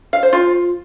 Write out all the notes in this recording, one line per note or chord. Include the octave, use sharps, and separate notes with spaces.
F5
C5
F4